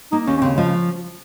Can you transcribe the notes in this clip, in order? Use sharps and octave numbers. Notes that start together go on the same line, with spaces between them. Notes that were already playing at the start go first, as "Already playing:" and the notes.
A#3 D#4
D#2 C#4
C#4
C#3 C4
F3 G#3